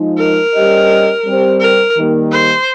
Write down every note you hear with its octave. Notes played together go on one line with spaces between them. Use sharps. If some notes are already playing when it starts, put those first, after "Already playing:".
Already playing: F3 G#3 D#4
A#4
G3 C#4 G4 C5 D#5
G3 C4 G4 C5
A#4
D#3 G3 A#3
C5